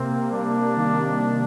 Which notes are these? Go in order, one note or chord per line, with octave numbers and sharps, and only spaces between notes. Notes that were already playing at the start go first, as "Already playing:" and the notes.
Already playing: C3 A#3 C4
G3 D4
D#3
A#3